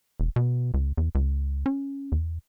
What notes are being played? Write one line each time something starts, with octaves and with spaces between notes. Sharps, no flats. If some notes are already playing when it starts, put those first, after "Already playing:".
E1
B2
C#2
E2
C#2
C#4
E2